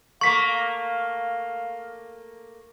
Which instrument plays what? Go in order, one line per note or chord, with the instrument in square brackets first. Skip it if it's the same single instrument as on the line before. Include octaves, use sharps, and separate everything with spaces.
[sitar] A3 A#3 [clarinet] F5 [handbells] C#6 B6